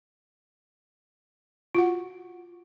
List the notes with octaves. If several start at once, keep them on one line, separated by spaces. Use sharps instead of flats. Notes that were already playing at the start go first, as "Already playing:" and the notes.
F4 F#4 F#5